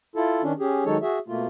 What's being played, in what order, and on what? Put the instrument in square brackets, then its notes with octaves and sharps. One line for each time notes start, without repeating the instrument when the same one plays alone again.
[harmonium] E4 F4 A4
D#3 C#4 D4
C#4 G4 G#4
D#3 F#3 G#3 D#4 A4 C#5
F#4 G#4 E5
B2 A3 A#3 F4